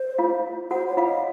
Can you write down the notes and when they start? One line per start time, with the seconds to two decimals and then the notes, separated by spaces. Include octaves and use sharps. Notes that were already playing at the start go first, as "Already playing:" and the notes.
Already playing: C5
0.18 F4 F5
0.71 F#4 C5 F#5
0.89 C#5
0.97 F4 F5
1.06 D#5